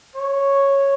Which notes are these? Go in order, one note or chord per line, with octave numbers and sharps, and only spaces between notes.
C#5